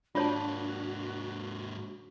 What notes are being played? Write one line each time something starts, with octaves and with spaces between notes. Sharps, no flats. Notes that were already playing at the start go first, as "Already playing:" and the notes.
G#2 A#3 D4 F4 F#4 C#5 A5